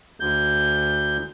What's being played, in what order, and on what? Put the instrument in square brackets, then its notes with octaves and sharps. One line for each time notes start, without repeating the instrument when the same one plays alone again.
[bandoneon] D2 G6